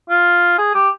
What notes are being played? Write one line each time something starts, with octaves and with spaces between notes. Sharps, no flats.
F4
G#4
G4